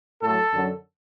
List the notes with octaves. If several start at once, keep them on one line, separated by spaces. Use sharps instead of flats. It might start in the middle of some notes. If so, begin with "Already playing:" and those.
A2 F#3 A4
F#2 D3 F#3